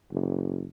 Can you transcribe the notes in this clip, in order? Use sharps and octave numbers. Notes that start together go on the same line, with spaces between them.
F#1